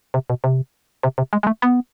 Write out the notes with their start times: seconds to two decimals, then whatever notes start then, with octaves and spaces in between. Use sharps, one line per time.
0.14 C3
0.30 B2
0.44 C3
1.03 C3
1.18 C3
1.33 G#3
1.43 G#3
1.47 A3
1.62 B3